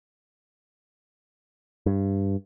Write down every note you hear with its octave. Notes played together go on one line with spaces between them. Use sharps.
G2